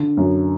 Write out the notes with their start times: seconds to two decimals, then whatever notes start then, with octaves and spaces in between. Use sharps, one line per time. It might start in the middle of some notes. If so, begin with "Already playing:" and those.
Already playing: D3
0.17 F#2